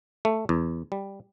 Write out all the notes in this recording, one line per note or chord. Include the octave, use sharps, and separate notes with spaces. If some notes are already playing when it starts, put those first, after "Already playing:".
A3
E2
G3